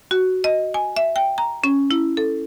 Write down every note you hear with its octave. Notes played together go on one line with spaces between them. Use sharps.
F#4
D#5
G#5
E5
G5
A#5
C#4
E4
A4